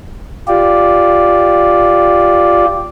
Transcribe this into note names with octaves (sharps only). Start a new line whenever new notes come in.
F4 G4 D5